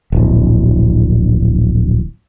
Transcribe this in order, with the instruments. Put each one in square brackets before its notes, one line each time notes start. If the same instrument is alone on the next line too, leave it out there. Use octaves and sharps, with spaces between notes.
[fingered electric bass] D1 A#1